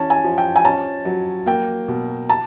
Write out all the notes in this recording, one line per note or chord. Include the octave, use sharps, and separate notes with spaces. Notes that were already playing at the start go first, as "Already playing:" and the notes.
Already playing: E3 C#4 A5
G#5
F3
G5
G#5
C#4 A5
F#3
A#3 G5
B2
A5